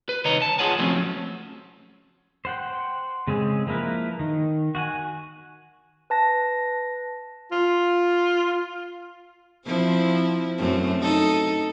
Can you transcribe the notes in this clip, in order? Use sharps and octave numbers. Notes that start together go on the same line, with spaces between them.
B4
C2 D#3 C#5 D#5 A#5
A5
F4 G#4 C#5 F#5 G#5 A5
F3 F#3 A3 C4 C#4
C5 F#5 G5
C#3 G#3 C4 G#4
F3 A#3 E4 A#4 B4
D#3
F#4 F#5 G#5
B4 A5 A#6
F4
F3 C4 E4
F#2 A3 C4
D#4 A4